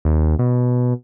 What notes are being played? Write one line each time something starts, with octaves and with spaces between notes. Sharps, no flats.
D#2
B2